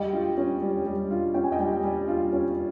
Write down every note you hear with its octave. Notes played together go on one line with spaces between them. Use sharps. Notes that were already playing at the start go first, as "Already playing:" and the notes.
Already playing: G3 D#5 G5
F4
C#4
G3
G3
F4
C#4 G5
G#5
D#5 G5
G3
G3
F4
C#4